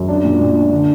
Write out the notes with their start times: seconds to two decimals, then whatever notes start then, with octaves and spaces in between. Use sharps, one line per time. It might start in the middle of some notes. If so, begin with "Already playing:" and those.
Already playing: F#2
0.08 D4
0.24 A#2
0.41 A#2
0.56 D4
0.71 D3